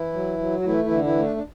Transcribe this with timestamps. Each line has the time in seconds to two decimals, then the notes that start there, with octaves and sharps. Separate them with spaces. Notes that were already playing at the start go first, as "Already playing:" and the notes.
Already playing: E3 E4
0.13 F#3
0.38 F#3
0.60 F#4
0.65 E3 A3 E4
0.84 E3 E4
0.91 D3
1.04 E3 E4
1.17 A3
1.23 D4
1.36 D4